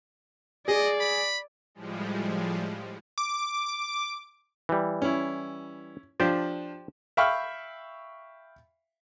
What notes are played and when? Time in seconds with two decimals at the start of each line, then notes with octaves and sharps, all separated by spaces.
0.68 G#4 D5 D#5
1.01 B5
1.75 A2 F3 G3 G#3
3.18 D6
4.69 E3 G3
5.02 C#4 E4
6.20 F3 D4 G4 C5 D5
7.17 E5 F5 G5 B5 C#6 F6